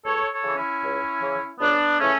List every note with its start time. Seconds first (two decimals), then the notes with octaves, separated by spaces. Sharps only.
0.05 C#2 A4 C#5
0.31 A4 C#5
0.43 C#3 E3
0.56 C#4 E4
0.83 C#2
1.22 C#3 E3
1.60 C#2 B3 D4
1.98 C#3 E3 A3 C#4